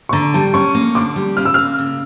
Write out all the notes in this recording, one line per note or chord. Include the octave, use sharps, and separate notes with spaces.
C#6
D3 A#5
G3 A5
C#4 C#6
A#3
D3 D6
G3
C#3 F6
E6
A#3 F6
C#3